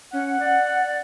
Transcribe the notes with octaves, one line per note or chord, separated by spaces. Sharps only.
C#4 F#5
D5